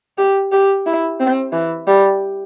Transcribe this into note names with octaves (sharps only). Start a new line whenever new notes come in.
G4
G4
E4
C4
E3
G3